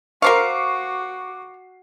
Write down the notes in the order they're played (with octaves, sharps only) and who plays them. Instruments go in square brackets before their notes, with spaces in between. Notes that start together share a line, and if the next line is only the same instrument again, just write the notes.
[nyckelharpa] F#4 [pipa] A#4 C5 F5 [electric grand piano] C#6 D6 C7